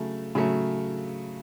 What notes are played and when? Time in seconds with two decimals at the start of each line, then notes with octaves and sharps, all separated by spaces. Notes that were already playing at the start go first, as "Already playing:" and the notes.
Already playing: C#3 F#3 A3
0.35 C#3 F#3 A3